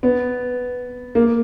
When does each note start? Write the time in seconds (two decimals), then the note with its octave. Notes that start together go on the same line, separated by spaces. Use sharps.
0.03 B3
1.15 A#3